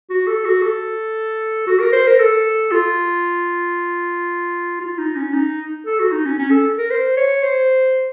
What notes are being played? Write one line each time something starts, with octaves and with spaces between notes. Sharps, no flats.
F#4
A4
F#4
A4
F#4
A#4
C5
A#4
A4
F4
F4
D#4
C#4
D#4
A4
F#4
D#4
C#4
C#4
A4
A#4
C5
C#5
C5